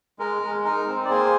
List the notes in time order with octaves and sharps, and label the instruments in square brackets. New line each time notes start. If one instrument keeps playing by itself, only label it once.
[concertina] G#3 A#4
G#3
D#4 A#4
C4
D5
A#3 G#4 C5